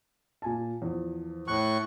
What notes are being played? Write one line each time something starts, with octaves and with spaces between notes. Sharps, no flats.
A#2 G#5 A5
E2 F3
A2 C#6 F#6